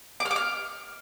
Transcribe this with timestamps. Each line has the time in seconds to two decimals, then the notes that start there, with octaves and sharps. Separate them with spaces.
0.20 D6
0.25 F6
0.31 D6
0.36 F6